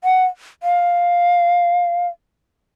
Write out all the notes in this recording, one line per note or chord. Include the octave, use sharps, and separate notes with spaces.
F#5
F5